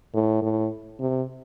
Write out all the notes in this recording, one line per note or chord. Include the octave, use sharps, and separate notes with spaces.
A2
A2
C3